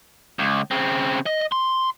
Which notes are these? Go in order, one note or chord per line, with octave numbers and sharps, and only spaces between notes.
C#2
C#3 C4
D#5
C6